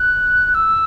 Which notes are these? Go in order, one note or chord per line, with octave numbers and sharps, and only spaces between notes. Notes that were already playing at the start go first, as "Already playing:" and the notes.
Already playing: F#6
E6